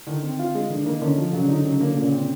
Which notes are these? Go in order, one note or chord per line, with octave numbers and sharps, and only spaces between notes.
D3 D#3
C4
F4
G#3
D3 D#3
D#3 A#3
D3 C#4
F3
C#3 F#3
D3 D#4
C#3 F#3
D3 A#3
A#2 C#3
C4